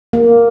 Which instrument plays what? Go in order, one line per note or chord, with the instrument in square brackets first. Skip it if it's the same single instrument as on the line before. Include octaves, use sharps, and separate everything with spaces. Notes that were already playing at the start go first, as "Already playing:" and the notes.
[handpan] A#3